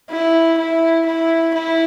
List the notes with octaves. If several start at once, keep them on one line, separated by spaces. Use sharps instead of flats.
E4
E4
E4
E4